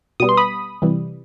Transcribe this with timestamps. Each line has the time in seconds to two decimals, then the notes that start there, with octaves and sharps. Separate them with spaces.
0.20 B2 G3 B3 D#6
0.29 C6
0.37 B5 D#6
0.82 C3 E3 G3